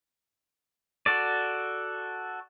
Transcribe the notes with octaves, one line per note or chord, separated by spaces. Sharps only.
F#4 A4 D5